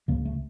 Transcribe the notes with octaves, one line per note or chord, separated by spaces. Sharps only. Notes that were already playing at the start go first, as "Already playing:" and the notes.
C#2 C#3 A#3
A3